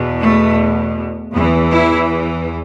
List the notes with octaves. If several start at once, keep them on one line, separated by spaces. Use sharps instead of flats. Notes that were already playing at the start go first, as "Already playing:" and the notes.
Already playing: E2 B2
A3
E2 E3 B3
E4